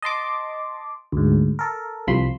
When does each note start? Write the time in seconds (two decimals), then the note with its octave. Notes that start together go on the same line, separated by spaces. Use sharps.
0.02 D#5 A5 C6 D6
1.12 D2 G#2
1.59 A4 A#4
2.07 C2 F3 B5 C6